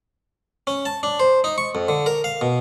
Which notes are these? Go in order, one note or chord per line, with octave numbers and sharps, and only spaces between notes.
C#4
A5
D4
C5
D#4
C#6
F2
D3
A#4
F5
B2